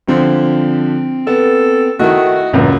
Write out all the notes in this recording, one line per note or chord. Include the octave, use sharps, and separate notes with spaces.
D3 F3 C4
B3 A4
D#3 A3 E4 F#4 D#5
C#2 F#2 A2 E3 A#3